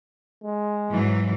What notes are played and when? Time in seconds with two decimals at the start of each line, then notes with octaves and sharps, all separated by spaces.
0.44 G#3
0.89 G#2 E3 F#3